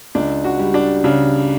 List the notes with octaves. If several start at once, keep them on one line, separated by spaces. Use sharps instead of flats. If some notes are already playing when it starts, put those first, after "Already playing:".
C#2 D4
D4 F#4
G3
D4
C#3 D4